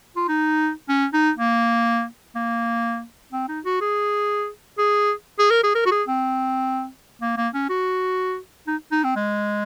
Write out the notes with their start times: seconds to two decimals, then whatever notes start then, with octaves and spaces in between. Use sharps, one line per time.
0.16 F4
0.28 D#4
0.89 C#4
1.13 D#4
1.37 A#3
2.35 A#3
3.32 C4
3.48 D#4
3.64 F#4
3.81 G#4
4.78 G#4
5.39 G#4
5.50 A#4
5.63 G#4
5.75 A#4
5.85 F#4
5.91 G#4
6.08 C4
7.21 A#3
7.37 A#3
7.53 C#4
7.69 F#4
8.67 D#4
8.91 D#4
9.03 C4
9.16 G#3